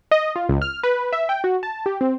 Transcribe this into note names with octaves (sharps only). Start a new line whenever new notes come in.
D#5
F4
C#2
F6
B4
E5
G5
F#4
A5
G4
C4